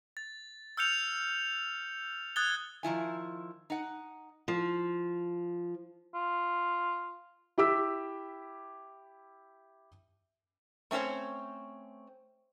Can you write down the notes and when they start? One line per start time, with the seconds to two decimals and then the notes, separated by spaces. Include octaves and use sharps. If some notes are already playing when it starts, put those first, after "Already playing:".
0.17 A6
0.77 E6 F6 G6 C#7 F7
2.36 D#6 F#6 G#6 A6 G7
2.83 D#3 F3 E4 G#5
3.70 D#4 F#5
4.48 F3
6.15 F4
7.58 E4 G4 D6 E6 B6
10.91 A3 C4 C#4 C5 C#5